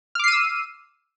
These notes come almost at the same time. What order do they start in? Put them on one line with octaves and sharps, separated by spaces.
F6 D6 C7 D#7 E6